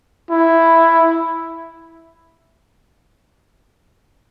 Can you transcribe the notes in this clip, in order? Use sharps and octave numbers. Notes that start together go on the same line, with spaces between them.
E4